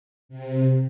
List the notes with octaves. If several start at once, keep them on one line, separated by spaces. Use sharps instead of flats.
C3